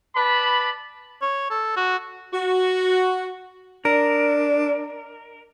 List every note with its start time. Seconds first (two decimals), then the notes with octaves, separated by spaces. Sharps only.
0.16 B4 D5 A5 B5
1.22 C#5
1.50 A4
1.77 F#4
2.33 F#4
3.85 D4 A#4 D5 D#5